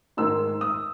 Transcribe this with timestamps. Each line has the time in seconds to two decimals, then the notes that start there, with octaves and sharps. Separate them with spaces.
0.17 G#2 D#3 G#3 D#4 E6
0.61 D#6